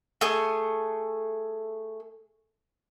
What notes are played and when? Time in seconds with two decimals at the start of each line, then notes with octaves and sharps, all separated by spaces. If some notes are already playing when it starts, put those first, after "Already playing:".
0.21 A3 G#4